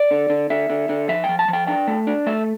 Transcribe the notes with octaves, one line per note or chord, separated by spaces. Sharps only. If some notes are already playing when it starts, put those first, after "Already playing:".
Already playing: D5
D3
D3
D3 E5
D3
D3
F3 E5
G5
F3
A5
F3
G5
D4 G5
A3
D4
A3 E5